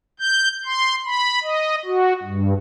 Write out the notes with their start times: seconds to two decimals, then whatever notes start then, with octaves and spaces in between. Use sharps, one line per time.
0.19 G6
0.65 C6
1.05 B5
1.42 D#5
1.86 F#4
2.23 G2